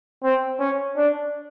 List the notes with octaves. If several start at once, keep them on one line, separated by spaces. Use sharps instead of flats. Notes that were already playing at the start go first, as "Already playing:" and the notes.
C4
C#4
D4